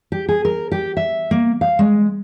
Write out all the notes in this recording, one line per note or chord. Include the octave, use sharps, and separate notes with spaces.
G4
G#4
A#4
G4
E5
A#3
F5
G#3